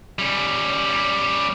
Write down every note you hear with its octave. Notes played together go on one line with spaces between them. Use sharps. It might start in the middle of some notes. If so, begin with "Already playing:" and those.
G3 C#4